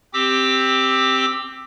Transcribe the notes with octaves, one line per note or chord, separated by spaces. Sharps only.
C4 G4 D6 E6